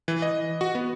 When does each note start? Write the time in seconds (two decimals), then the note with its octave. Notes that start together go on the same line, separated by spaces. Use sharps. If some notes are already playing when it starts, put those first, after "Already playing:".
0.08 E3
0.22 D#5
0.61 F#4
0.75 B3